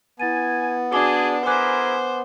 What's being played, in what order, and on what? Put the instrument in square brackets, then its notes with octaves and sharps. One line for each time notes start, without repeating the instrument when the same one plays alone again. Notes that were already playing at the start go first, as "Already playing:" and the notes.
[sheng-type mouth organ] B3 [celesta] E4 A6 D#7 [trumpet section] G#5
[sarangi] D4 [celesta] F#4 D6 G7 [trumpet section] G#4
[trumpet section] E4 G#4 A#4 [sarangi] C5 [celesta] G#5 D6 F#6